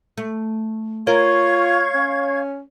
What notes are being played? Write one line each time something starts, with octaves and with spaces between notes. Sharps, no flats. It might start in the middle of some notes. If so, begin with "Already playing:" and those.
A3
F4 A#4 C#5 F5 C#6 G#6
C#4